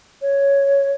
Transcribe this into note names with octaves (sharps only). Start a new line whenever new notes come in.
C#5